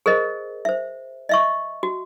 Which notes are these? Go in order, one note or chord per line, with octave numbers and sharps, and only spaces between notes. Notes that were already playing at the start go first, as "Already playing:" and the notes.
G#4 A#4 C5 D#5
C5 E5
D#5 E5 C#6
F#4